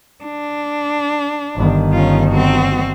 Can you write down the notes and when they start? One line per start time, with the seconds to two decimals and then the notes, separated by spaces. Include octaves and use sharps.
0.24 D4
1.56 G1 D#3
1.92 C#4 F4
2.29 C4 F#4